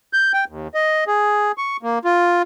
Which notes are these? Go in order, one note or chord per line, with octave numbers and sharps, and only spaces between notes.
G6
G5
D#2
D#5
G#4
C#6
A#3
F4